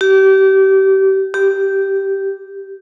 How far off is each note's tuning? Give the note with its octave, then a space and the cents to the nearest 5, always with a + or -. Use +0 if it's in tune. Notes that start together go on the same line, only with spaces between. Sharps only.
G4 -30
G4 -10